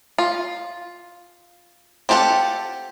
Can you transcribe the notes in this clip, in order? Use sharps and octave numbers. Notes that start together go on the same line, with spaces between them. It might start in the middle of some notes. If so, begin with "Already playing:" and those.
F4
C4 F4 G4 A4 F#5